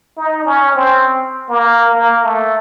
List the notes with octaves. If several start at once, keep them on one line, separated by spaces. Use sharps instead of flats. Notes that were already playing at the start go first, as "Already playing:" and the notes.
D#4
C#4
C4
A#3
A#3
A3